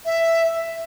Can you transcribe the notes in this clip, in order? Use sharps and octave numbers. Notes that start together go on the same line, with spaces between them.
E5